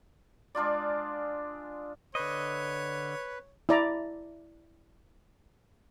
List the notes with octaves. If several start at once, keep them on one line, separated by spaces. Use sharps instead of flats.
G#3 D4 F4 D5
D3 B4 C#5 D#5
E4 D5 A#5